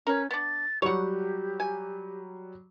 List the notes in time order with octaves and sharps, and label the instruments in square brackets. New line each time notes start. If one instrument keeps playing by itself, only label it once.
[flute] C#4 [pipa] A#4 B4
[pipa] B3 D4 [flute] A6
[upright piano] F#3 G3 [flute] G4 [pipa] C#5 F#5
[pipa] G#5